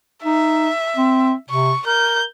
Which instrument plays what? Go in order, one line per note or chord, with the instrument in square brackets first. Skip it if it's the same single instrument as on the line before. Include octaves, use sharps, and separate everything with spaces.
[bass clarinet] D#4 [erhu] E5
[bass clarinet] C4
[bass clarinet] C3 [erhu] C#6
[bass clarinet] A#4 [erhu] G6